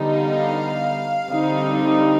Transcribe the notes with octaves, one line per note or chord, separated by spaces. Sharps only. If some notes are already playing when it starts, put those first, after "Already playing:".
Already playing: D3 G3 B3 D#4
F5
D3 G3 C4 D#4